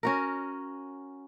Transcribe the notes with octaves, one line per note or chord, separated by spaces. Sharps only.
C#4 F#4 A#4